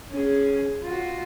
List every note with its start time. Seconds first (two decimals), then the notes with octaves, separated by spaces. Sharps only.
0.12 C#4 G#4
0.83 F4 F#4